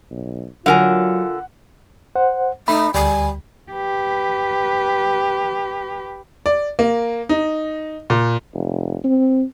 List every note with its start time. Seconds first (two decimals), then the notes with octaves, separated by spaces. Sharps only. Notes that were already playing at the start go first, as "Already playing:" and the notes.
0.11 B1
0.66 D3 F#3 F4 A#4 F#5 G#5
2.16 C5 F#5
2.68 A3 D#4 B5
2.94 D2 G3 G#5
3.72 G4 B4
6.46 D5
6.79 A#3
7.29 D#4
8.10 A#2
8.54 F1
9.04 C4